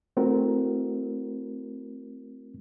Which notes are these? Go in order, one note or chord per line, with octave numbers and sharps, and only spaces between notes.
A3 C4 E4 F#4 A#4